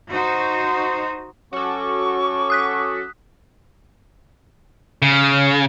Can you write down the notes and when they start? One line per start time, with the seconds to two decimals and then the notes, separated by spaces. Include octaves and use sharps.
0.13 D#4 F#4 C5
1.53 F#3 C#4 F#4 A4 C#6 D6
2.50 D#6 F#6 B6
5.02 C#3